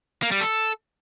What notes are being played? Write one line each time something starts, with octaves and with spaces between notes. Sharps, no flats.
A#3
G3
A4